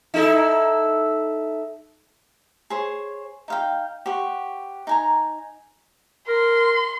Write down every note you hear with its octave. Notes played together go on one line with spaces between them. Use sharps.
D#4 E4 A4
G#4 C5 C#5
D#4 F5 G5
G4 C5 F#5 C#6
D#4 G#5 A#5
A#4 C6